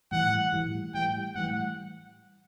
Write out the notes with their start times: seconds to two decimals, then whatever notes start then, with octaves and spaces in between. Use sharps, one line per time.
0.12 A2 E3 G3 F#5
0.53 A2 E3 G3
0.94 A2 E3 G3 G5
1.35 A2 E3 G3 F#5